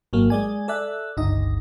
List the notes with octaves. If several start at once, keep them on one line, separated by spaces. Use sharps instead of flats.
G#1 F#3 A#3
G#3 D5 G#5
A4 D5 E5 F#6
G1 C#2 D#4 D#5